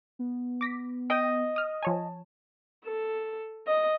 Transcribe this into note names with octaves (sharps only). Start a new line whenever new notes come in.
B3
D6 A#6 B6
D#5 G5
D#6 F6
F3 C#5 G#5 A5
A4
D#5